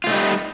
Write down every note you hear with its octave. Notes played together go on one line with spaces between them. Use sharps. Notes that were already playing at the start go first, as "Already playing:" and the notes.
G3 A3 D#4 F4